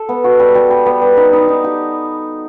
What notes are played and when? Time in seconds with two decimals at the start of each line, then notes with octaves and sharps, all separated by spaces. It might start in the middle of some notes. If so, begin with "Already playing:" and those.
Already playing: A4
0.09 B3
0.24 F#4
0.40 G3
0.55 G3
0.70 G3
0.86 B3
1.02 G3
1.17 D#4
1.33 D#4
1.48 D#4
1.64 G4